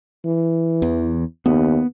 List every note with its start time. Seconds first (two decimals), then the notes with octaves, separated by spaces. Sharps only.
0.25 E3
0.82 E2
1.46 D#2 B3